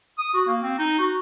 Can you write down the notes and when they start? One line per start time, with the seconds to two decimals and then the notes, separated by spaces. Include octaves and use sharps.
0.18 D#6
0.34 F#4
0.47 A#3
0.62 C4
0.78 D#4
0.99 F#4